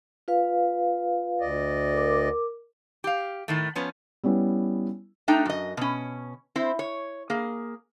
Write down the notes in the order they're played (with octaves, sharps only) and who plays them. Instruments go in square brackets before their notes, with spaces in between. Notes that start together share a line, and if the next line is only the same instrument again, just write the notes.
[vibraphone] F4 B4 F5
[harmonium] D2 D5 D#5
[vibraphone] A#4 D6
[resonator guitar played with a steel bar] G4 F5
A2 D#3 A3
F3 B3 C#4
[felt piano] G3 B3 C#4 E4
[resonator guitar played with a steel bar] A3 D4 D#4 G5 A#5
F#2 D#5
B2 C#4
C4 E4 C5
C#5
A#3 G#4